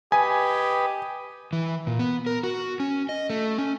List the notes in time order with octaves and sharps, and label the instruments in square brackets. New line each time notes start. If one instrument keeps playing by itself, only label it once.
[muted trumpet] G4 [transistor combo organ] B4 D#5 [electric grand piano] G#5
[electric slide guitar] E3
A#2
B3
A#4
F#4
C#4
D#5
A3
C#4